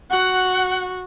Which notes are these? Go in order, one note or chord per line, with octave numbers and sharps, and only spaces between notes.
F#4 F#5